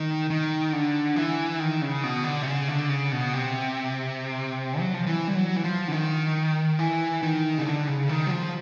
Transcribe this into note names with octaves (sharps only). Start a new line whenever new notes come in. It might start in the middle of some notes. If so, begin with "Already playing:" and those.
Already playing: D#3
D#3
D3
E3
D#3
C#3
B2
D3
C3
C#3
D3
C#3
B2
C3
F#3
F3
E3
G3
F#3
E3
F3
D3
D#3
E3
D#3
C#3
D3
C#3
D#3
F#3
F3